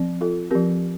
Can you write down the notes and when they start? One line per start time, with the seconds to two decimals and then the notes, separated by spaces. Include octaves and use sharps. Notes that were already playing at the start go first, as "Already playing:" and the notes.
Already playing: F3 C4
0.21 F4 A4
0.51 F3 C4 G4 A#4